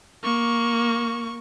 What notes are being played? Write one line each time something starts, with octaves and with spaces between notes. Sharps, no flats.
A#3 C#6